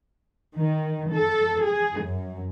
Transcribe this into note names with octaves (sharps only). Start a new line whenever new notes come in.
D#3
A4
G#4
F#2